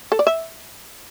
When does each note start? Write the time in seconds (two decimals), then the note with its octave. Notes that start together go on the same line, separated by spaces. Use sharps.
0.12 A4
0.19 D5
0.27 E5